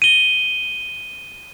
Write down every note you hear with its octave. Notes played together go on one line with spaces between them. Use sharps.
D#7 G7